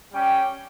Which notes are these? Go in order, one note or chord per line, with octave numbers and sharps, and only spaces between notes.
G3 C#4 G4 G5